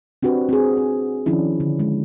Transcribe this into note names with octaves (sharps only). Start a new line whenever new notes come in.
C4 D4 F#4 G4 B4
C4 G#4
C4
D#3 F3 C#4 D4 E4
D3
G#3